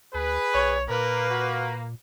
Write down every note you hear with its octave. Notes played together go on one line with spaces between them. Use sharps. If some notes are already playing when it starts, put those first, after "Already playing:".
D2 G#4 B4
B1 C#5
A#2 A#3 A#4 B4
F#4